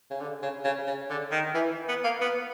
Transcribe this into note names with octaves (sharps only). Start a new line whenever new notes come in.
C#3
D3
C#3
C#3
C#3
D3
D#3
E3
B3
A#3
B3